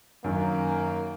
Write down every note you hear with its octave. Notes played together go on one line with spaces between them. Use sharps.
F#2 D#3 A#3